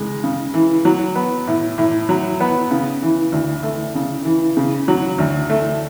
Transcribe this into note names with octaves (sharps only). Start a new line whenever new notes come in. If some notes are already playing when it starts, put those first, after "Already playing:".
Already playing: C#2 G#3
C#3
E3
F#3
B3
A2
A2
F#3
B3
C#3
E3
D2
A3
C#3
E3
C#3
F#3
D2
A3